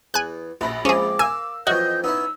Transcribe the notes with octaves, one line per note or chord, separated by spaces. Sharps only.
E2 G#5 F#6
A#1 F#4 B5 A#6
F3 G#3 C4 C#4 G#4 D6
A#4 F5 G#5 E6
F2 E3 F#3 F#4 D#5 G6
B3 C#4 D#4 E4 E6